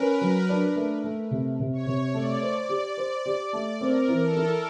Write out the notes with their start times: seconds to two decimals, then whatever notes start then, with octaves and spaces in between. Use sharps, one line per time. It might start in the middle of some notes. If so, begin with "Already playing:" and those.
Already playing: C#4 A#4 B4
0.21 F#3
0.49 D4
0.75 A3
1.04 A3
1.31 C3
1.60 C3
1.73 C#5
1.86 C3
2.14 A3 D5
2.42 C5
2.69 G4
2.97 C5
3.26 G4
3.39 D5
3.53 A3
3.80 C4 A#4
4.08 E3
4.23 A4
4.36 E4